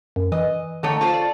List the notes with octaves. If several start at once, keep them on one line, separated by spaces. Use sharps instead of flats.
F#2
E3 D#5
D3 D#3 A3 C#5
F4 A4 C5 C#6
D5